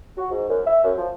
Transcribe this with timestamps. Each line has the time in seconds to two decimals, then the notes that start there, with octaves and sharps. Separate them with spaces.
0.18 F#4
0.31 G#2
0.49 F#2
0.66 E5
0.84 F#2
0.98 F3